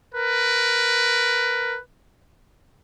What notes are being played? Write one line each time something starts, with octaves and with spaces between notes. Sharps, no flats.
A#4 B4